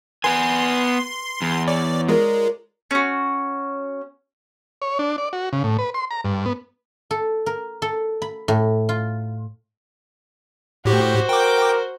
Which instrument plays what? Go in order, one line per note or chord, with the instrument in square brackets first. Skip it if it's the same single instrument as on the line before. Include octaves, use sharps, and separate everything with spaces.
[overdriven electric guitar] B3 G#5 [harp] B4 [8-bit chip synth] C6
[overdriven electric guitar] E2
[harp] C#5 [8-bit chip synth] D5
[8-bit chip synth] G#3 [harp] F4 A#4 D5
[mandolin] C#4 F#4
[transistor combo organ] C#5
D4
D5
F#4
C#3
A2
B4
C6
A#5
G2
B3
[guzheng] A4
A#4
A4
B5
A2
F4
[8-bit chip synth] A2 G4 [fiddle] F#4 C5
[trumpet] A#4 [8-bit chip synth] G5 D6